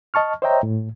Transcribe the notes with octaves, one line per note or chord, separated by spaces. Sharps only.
D#5 A5 C#6 F6
C5 C#5 D#5 E5 G5 A#5
A2